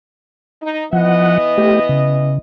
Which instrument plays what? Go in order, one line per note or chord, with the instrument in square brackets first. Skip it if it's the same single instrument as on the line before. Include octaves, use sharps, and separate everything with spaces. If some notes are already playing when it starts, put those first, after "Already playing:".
[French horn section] D#4
[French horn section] E3 B3 D#5 [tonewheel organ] F3 F#5
[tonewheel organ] A3 G4
C#3